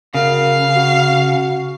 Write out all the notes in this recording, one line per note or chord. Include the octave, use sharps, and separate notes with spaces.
F#2 C#3 F5
F#4